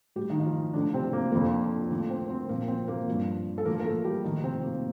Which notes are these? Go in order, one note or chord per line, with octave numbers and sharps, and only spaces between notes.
A2 G3 G4
D#3 D#4
D#4
F3 F4
A2 D3 F3 D4
C3 C4
A#3
F2 D3 F3 A#3
A2 D3 F3 D4
C4 C5
A#4
C4 C5
A#2 F3 A#3 A#4
C4 C5
A#3 A#4
G2 F3
A4
A2 F3 A#3 A#4
A#4
A3 A4
G3 G4
A2 D#3 F3 D#4
C3 C4
A#3